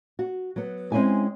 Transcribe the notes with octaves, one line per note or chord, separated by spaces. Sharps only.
F#4
F#3 B3
G#3 C4 C#4 E4 G#5